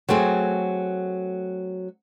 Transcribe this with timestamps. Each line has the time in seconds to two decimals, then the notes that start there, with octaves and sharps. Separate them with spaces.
0.09 F#3 A3 C4 G#4